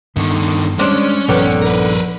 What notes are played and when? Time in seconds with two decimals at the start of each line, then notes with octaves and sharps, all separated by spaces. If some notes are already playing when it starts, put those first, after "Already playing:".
0.16 D2 G2 D3 D#3 B3
0.79 G3 G#3 C#4 D4 C5
1.28 A#1 G2 D3 D#3 F3 B3
1.62 A#4 B4